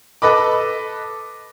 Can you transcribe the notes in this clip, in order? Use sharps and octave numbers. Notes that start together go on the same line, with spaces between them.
A4 B4 D#5 B5 D6